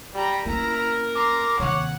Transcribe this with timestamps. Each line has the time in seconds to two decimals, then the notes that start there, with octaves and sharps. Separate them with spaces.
0.14 G3 G4 A#5
0.46 A#3 C#4 E4 A#4 A#5
1.15 A#5 C6 D6
1.59 D#2 C3 C#5 F#5